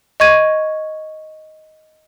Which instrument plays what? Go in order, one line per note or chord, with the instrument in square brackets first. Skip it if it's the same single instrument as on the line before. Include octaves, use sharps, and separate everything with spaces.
[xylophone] D#5 C#6 G#6 D#7